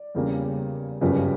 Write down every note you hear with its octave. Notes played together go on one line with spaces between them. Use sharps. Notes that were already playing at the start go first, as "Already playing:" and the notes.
Already playing: D5
E2 C#3 G3 A#3
G1 F#2 C#3 G3 C#4 B4